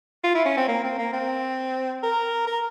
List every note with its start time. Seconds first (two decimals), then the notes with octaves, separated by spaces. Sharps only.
0.24 F4
0.35 E4
0.45 C#4
0.57 C4
0.68 A#3
0.84 C4
0.98 A#3
1.13 C4
2.03 A#4
2.47 A#4